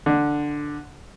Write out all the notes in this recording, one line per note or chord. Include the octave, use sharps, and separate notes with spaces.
D3